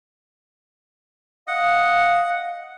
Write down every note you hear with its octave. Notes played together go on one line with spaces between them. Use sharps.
D#5 F5 F#5